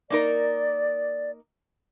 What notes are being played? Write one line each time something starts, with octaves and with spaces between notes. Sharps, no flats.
A#3 D#4 A#4 D5